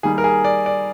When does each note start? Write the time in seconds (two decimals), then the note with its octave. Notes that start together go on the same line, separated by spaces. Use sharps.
0.03 D#3 G3 A#3 G#4
0.18 A#4
0.24 G#4
0.44 D5
0.66 D5